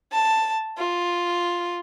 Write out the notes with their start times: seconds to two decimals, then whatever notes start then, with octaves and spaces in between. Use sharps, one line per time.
0.12 A5
0.78 F4